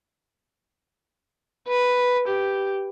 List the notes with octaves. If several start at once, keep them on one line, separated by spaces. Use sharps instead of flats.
B4
G4